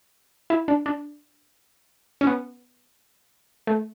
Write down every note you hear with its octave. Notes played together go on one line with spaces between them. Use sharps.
E4
D4
D4
C#4
B3
A3